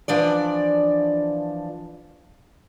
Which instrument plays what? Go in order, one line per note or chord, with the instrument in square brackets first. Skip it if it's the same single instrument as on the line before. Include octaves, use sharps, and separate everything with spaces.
[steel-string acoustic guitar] E3 F3 D4 D5